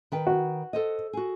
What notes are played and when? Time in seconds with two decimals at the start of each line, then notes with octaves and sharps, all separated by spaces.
0.12 D#3 B4 G5
0.27 F#4
0.73 A4 C5 D#5
1.13 F#4 G#4